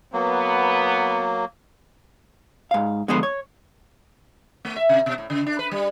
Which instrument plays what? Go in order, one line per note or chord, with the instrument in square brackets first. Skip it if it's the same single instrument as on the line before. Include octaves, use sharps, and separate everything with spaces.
[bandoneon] F#3 A#3 [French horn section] B3
[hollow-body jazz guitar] G#2 F5
D3 F3 G#3 B3 B4 C5
C#5
[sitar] A3
E5
C3
B2
A2
C#3
D4
B4
G3